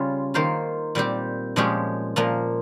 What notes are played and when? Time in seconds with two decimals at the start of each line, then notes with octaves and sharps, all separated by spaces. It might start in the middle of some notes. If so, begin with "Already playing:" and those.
Already playing: C#3 G3 C#4 F4
0.34 D#3 A#3 F4 C5
0.95 A#2 G3 C4 G4
1.56 A#2 F3 G#3 C#4 G4
2.16 A#2 F3 A#3